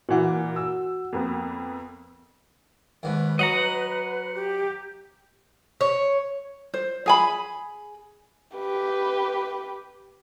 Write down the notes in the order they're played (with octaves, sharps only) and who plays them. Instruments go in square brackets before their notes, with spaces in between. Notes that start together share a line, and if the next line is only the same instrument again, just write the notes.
[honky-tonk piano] A#2 E3 [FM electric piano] F#4 F#5
[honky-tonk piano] E6
F2 A#3 B3
[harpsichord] D#2 G#2 [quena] B4
[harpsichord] F#3 [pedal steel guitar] D#5 F#5 A#5
[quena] G4
[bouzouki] C#5
[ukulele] C5
G#4 G#5 B5
[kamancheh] G4 B4